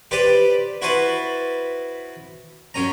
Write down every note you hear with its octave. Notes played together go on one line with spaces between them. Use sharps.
G4 B4 C5 D5
E4 F#4 B4 C5 A5
F#2 C#4 A#5